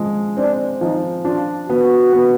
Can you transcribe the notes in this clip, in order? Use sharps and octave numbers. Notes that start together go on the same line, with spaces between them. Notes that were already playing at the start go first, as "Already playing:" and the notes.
Already playing: F3 G#3
C4 D4
F3 D#4
D4 F4
B3 F#4
B3